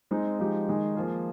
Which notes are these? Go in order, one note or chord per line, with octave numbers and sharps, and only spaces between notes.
G#3 C4 D#4
F3 G#3 D#4 G4
D#3 G#3 D#4
F3 A#3 F4 G#4